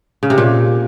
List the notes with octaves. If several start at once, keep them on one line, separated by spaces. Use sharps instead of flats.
C#3
C3
A#2